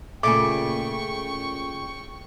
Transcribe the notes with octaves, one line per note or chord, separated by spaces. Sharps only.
A#2 C#3 A3 G#4 G5 C#6 D6